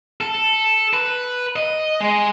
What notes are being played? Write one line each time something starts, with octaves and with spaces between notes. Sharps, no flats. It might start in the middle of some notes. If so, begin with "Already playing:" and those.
A4
B4
D#5
G#3